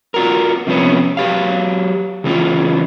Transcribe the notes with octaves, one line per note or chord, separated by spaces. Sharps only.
F4 F#4 A#4
C3 F3 G#3 B3 C#4
F#3 G4 F5
C#3 E3 C#4 F4